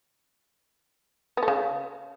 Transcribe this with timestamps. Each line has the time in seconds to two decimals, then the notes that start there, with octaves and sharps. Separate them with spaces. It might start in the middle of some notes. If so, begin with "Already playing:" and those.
1.37 B3
1.43 A3
1.48 C#3